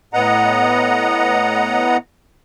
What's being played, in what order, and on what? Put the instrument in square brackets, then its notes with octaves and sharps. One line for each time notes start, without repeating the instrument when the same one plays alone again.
[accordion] A2 B3 D#5 F#5 A#5